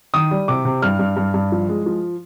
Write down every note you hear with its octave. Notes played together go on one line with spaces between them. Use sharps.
D#3 D#6
G3
C3 D6
C3
G2 F6
G2
G2
G2
F3
G#3
F3